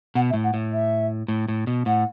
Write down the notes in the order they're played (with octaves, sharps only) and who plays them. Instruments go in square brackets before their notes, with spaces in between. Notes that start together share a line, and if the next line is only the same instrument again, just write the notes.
[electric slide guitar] B2 [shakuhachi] F#5
[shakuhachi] E5
[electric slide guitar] A2
[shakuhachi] F#5
[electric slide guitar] A2
[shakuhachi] E5
[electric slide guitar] A2
A2
B2
[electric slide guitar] A2 [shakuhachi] F#5